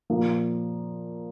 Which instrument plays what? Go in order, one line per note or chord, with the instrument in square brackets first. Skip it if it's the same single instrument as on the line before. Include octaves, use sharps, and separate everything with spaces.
[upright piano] A#2 F3 A#3